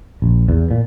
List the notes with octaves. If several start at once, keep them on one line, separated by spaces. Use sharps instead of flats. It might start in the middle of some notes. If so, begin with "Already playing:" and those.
A#1
E2
A#2